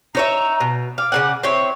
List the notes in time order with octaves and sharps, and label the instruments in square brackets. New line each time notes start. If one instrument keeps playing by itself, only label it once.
[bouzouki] D#4 C#5 E5 [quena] A#5
[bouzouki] B2
[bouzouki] F5 [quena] D6
[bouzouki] C#3 A#3 F#5
[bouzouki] C4 E4 C#5 [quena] C#6